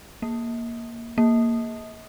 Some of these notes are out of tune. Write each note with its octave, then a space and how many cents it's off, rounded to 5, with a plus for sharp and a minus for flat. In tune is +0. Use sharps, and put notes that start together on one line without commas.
A#3 +5
A#3 -5